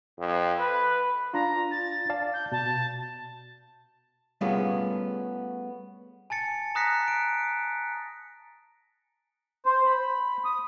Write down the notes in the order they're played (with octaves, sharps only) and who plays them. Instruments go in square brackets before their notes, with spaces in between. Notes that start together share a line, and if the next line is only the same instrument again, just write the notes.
[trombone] F2
B4
[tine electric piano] D4 F4 [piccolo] A#5
[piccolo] A6
[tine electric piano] D5 F5 A5
[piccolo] G6
[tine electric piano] B2 [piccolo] A5
[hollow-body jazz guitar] G3 A3 B3 C#4 F4 G#4
[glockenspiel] G#5 A5 A6 C#7
A#5 D#6 F#6 A#6 B6 C#7
D7
[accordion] C5
B5
D#6